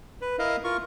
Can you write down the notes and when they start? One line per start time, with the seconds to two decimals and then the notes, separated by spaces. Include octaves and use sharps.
0.21 B4
0.39 E4 A#4 D#5 F5
0.64 F4 A#4 C#6